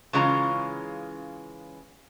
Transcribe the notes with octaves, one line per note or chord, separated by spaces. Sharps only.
C#3 E3 G#3 C#4 F4 A#5